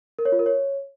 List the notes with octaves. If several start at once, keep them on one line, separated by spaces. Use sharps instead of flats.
A#4
C#5
F4
A#4
C#5